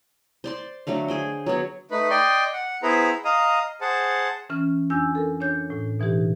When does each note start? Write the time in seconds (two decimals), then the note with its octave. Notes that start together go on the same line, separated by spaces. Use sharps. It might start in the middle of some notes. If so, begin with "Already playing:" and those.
0.44 C5 D5 C6
0.87 D3 F#3 A3 F5
1.08 G#4 C5 G5
1.46 F#3 B3 C#5
1.91 A3 D#4 B4
2.10 D5 D#5 G5 C6
2.53 F#5
2.83 B3 E4 G#4 B4 C5 A#5
3.25 D#5 F5 A#5 D#6
3.81 G#4 C5 F#5 A5
4.49 E3 C#4 F6
4.90 F2 D4 G#5 E6 G6
5.15 A4 A#4
5.40 D4 C#5 G6
5.70 A2
6.00 B2 E3 D#4 G4